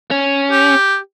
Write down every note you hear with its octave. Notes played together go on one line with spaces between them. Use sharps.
C#4
G4